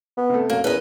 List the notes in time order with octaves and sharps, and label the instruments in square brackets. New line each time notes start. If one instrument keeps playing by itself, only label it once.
[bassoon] B3
[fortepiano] C3 A3
[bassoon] F#2 [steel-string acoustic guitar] A#3
[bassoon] E2 [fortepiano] C#4 A#4 [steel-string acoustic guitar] B4 D#5